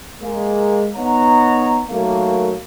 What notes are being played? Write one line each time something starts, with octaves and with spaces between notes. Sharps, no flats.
G#3 A#3
B3 D#4 C#5 F#5 A#5
D#3 F#3 A3 A#3